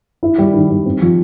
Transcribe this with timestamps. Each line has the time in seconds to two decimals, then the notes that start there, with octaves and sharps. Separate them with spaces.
0.23 E4
0.38 G3
0.54 D#3
0.70 G3
0.86 C4
1.02 F3